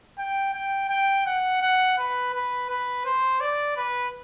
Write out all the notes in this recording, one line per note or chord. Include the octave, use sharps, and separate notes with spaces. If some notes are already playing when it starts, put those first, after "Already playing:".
G5
G5
G5
F#5
F#5
B4
B4
B4
C5
D5
B4